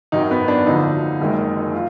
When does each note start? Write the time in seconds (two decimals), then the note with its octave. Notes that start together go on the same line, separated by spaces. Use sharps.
0.12 G#1 F#2 D#3 F#3 D#4
0.31 B3
0.48 D4
0.67 D2 D3 F3 D#4
1.20 F#1 F#2 D#3 G#3
1.74 F4